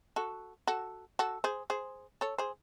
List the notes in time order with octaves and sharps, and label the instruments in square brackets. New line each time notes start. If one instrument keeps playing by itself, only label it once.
[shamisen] F#4 A4
F#4 A4
F#4 A4
G#4 C5
G#4 C5
A4 C#5
G#4 C5